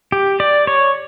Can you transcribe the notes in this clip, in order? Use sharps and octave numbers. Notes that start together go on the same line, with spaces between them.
G4
D5
C#5